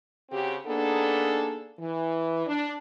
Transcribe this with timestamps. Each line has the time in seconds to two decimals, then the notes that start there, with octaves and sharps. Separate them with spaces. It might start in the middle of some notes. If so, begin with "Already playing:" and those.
0.30 C#3 C4 F#4 G4
0.66 A#3 B3 D4 D#4 G#4 A4
1.79 E3
2.47 D4